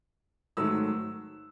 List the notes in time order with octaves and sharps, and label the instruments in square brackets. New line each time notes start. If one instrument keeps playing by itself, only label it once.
[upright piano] G#2 D#3 F#3 A3 E6